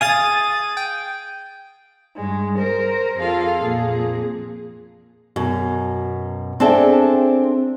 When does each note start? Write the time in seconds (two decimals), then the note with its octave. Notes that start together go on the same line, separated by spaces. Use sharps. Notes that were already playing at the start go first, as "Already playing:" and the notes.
0.01 G#4 F5 G#5 D#6 A6 D#7
0.77 G5
2.16 G2 G#3
2.57 A#4 C5
3.17 F2 F4 G#4 A4 F5
3.62 F2 A#2 G#4
5.36 F#2 B2
6.60 C4 D4 G#4 A4 E5 G5